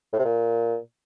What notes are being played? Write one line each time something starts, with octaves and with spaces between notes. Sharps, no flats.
A2
C3
A#2